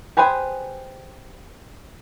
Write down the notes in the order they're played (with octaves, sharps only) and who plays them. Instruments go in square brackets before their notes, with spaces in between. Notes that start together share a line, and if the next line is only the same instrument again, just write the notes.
[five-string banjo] G4 G#4 B4 C5 G#5